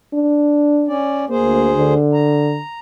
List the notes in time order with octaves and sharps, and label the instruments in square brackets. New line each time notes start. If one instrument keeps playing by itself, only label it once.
[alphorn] D4
[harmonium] C#4 D5
[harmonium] D2 G#4 C5 [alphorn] A#3
[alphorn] D3
[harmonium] A#5